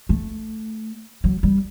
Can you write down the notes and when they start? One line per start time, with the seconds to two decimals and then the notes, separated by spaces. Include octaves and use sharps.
0.09 A3
1.24 F#3
1.43 G3